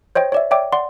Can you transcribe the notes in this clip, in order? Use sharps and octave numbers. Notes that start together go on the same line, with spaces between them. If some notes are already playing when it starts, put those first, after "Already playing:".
C5 C#5 D#5 G5
C#5 D5 E5
C#5 D5 E5 G5 D6
D5 F#5 C6